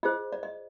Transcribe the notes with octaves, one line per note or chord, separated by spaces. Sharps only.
F4 G#4 C5 D#5
D5
D#5